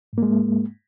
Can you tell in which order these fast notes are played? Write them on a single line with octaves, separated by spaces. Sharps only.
G#2 A#3 G#3